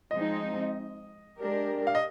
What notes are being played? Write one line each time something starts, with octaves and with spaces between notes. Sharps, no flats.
F3 G#3 C4 D#4 D#5
G#3 D4 G4 A#4
F5
D#5